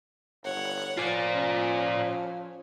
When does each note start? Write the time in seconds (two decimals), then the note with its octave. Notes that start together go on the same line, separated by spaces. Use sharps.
0.44 G1 C#5 F#5
0.98 F3 F4 D5
1.32 C#4